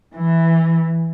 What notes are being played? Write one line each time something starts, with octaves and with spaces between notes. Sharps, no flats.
E3